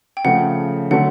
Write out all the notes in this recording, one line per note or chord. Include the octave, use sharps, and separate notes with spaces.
G5
C#3 F3 A3 F#5
D3 F#3 A3 F#5